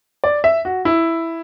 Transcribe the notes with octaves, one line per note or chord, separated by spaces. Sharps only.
D5
E5
F#4
E4